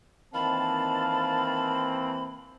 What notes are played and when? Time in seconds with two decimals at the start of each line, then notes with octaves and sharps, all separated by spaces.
0.34 D#3 E3 A#3 C4 F5 A5 B5